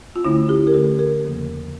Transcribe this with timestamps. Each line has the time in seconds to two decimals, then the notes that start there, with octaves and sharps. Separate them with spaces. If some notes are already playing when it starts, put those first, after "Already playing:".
0.16 F4
0.25 D2 D3 A3 C#4 E4
0.49 G4
0.67 A#4
0.74 D2 D3 A3 C#4 A4
0.99 A#4
1.23 E2 C#3 F3 A#3